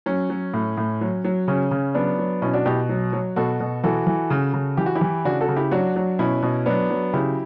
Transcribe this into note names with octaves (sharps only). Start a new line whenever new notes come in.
F#3 C#4
F#3
A2
A2
F#3
F#3
C#3 C#4
C#3
F#3 B3 D4
F#3
B2 C#4 E4
D4 F#4
B2 E4 G4
F#3
F#3
B2 F#4 A4
B2
E3 F#4 A4
E3
C#3
C#3
E3 G4
F#4
E4 G4
E3
C#3 D4 F#4
F#4 A4
C#3
E4 G4
F#3 D4 F#4
F#3
B2 C#4 E4
B2
F#3 B3 D4
F#3
C#3 E4 G4